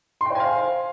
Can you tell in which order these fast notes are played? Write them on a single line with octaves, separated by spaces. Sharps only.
C6 G5 C5 G#5 F5